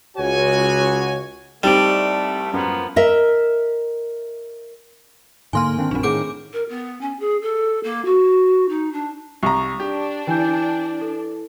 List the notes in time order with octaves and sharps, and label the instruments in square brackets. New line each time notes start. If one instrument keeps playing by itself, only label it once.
[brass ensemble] C#2 F#4 C#5 G#5
[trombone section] C2 A3 [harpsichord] G3 [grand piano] C4 D#4 G4 [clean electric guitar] A4 D5
[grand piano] F#2 [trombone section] F3 A#3 B3
[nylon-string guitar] A#4 D#5 E5
[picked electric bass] G#2 D3 A#3 [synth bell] G#5 C6 F6
[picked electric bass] D#3 C4 D4
[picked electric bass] A#1 F#2 [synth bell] C4 D4
[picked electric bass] A2 D3 D#3 [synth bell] G#4 D6 D7
[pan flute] A#4
B3
C#4
G#4
A4
A#3
F#4
D#4
D4
[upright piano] C2 A#5 [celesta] C#6
[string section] D4 [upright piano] G4
[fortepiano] E3 [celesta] G5 G#5 G6
[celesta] A4